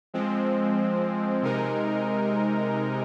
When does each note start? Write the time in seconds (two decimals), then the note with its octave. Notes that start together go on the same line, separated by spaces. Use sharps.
0.14 F3 G#3 C4
1.42 C3 G#3 D#4 A#4